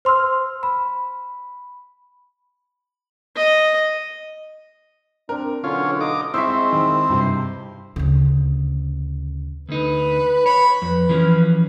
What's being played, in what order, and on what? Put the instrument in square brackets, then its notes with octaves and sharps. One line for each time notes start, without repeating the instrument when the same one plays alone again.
[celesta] C5 C6 E6 F6
B5
[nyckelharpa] D#5
[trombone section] C4 D4 [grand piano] A#4
[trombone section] B1 D3 [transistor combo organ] C#4 F4
[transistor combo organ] D#4 D6
[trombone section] G#2 G#3 [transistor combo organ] C4 E4 C5 [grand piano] E5 C#6 E6
[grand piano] D#3
G2 C3
[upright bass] D2 C#3
[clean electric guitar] D2 D#4 [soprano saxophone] B4
[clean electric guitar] C#5 [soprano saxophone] B5
[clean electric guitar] F2 [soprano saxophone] B4
[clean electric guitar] E3 F3 C#4